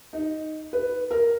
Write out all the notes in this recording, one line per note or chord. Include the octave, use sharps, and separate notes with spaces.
D#4
B4
A#4